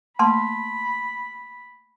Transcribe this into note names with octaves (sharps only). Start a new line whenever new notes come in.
A3 A#3 A5 B5 C6